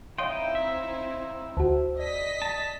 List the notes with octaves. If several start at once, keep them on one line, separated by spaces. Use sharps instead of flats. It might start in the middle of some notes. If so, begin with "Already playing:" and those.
C4 D#4 E4 C#5 D#5 F5 G5 C6
E5
D2 F#4 C5 A5
D5 D#5 B6
A5